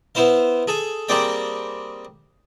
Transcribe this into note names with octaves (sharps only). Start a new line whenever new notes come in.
B3 E4 C5 F5
G#4 A4 G#5
G3 A#3 C4 G#4 D5 G5